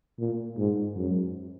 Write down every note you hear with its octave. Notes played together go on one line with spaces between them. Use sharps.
A#2
G#2
F#2